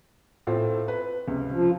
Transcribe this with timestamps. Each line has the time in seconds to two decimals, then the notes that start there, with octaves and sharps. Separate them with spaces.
0.47 A2 C4 F4
0.88 B4
1.27 C#2 C3
1.52 F3